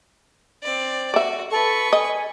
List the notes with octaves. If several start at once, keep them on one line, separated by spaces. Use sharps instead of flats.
C4 D5
F#4 D5 E5
A4 B4 C#6
D#5 G#5